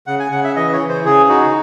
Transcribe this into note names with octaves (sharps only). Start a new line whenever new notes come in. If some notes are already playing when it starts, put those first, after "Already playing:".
C#3 F#5
G#5
C#3 F#5
E5
E3 D#5
C#5
E3
C5
C#3 G#4
D#4 F#4